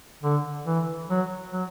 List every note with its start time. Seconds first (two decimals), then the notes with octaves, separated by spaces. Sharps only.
0.23 D3
0.66 E3
1.10 F#3
1.52 F#3